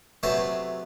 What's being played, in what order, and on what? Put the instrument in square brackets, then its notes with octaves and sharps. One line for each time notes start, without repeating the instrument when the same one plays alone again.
[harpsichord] C3 F#3 A3 B3 G#4 A5